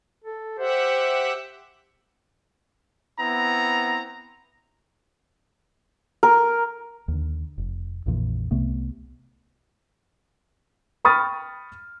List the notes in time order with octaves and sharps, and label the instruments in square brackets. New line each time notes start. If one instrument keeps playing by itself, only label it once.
[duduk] A4
[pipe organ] G4 E5 F#5 [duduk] C5
[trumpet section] B3 C4 E4 A#5
[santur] A#4
[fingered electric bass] D#2 D3
F1
A#1 F2 A#2 E3
C2 C3 A3 B3
[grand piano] G5 B5 C#6 D#6 F6 A6